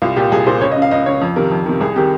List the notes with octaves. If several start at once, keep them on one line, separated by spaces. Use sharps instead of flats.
C2 F4
A#2 G4
C2 G#4
A#2 C5
C#2 C#5
D#5
C#3
F5
C#2 D#5
C#3 C#5
F2
C3 D#3 A#4
F2
C3 D#3
C2 G#4
C3 D#3 G4